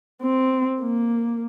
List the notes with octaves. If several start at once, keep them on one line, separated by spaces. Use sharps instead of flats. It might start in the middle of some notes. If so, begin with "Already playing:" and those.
C4
A#3